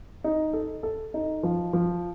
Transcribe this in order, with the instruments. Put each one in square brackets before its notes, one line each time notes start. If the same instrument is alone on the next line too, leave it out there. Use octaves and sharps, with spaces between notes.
[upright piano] D#4
A4
A4
D#4
F3
F3